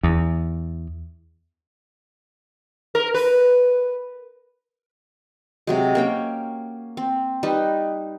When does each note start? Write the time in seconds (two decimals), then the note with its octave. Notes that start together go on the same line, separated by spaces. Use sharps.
0.03 E2
2.95 A#4
3.14 B4
5.67 C3 F#3 G#3
5.95 A#3 C#4 G5
6.97 C4
7.43 G3 D#4 B4